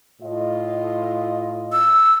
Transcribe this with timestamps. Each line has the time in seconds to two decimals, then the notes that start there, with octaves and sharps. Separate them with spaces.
0.22 A2 F4 D#5
1.72 E6